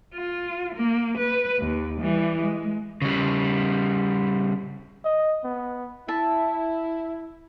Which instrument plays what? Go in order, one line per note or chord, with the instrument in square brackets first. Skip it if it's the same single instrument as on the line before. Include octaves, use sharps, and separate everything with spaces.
[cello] F4
A#3
B4
D#2
E3 G3
G#3
[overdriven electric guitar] C#3 G3
[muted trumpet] D#5
B3
[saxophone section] E4 [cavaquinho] E5 A5